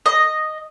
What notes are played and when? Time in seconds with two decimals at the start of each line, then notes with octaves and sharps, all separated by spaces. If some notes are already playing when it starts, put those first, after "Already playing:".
0.06 D#5